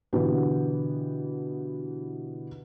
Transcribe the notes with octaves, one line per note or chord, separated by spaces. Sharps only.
B2 D3 E3 B3 G4